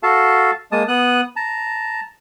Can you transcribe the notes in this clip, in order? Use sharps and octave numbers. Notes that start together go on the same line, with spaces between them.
F#4 A4 F5 A5
G#3 A#3 A5 D#6
B3 D#6 F#6
A5 A#5